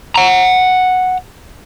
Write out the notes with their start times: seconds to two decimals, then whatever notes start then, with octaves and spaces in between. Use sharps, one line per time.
0.16 F#5 A#5